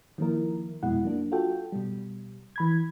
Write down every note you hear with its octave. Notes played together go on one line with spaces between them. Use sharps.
D#3 F3 A#3 E4 A#4
F2 B2 G#3 E4 F#5
F#3 A#3 D4
F4 F#4 A4 G5
B2 G3
E3 B5 G#6